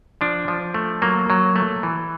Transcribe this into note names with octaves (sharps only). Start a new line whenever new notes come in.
F3 D4
F3
A3
F#3 A#3
F#3
A3
E3